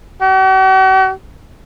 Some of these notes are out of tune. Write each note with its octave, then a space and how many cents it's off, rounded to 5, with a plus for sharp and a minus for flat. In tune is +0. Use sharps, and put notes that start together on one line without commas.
F#4 +45